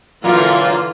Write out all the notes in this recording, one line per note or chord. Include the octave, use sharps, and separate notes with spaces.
F#2 A#2 D3 E3 A#3 F4